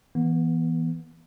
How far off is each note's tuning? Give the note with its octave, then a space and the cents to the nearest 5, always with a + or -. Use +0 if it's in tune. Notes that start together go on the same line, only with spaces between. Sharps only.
E3 +0 B3 -25